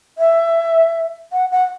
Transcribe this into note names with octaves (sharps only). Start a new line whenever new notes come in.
E5
F#5
F#5